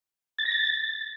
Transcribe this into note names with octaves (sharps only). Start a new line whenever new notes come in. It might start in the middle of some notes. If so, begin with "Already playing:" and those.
A6
A#6
A6